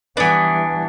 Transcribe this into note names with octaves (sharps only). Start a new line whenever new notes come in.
E3 G3 B3 D4 B4 G#5